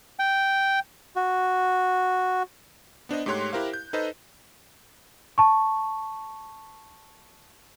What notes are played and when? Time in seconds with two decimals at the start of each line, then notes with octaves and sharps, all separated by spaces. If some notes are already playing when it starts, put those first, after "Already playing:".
0.19 G5
1.16 F#4
3.09 B3 D4 C5 D#5
3.26 G#2 A3 G4 C#5 C6 F#6
3.53 E4 G4 A#4 C5 F5
3.74 G6
3.93 D#4 A4 B4 C5 D#5
5.38 A5 C#6